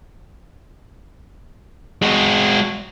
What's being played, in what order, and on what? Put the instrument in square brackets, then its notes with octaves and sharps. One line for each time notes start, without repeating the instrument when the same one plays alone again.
[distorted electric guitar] G#3 F#4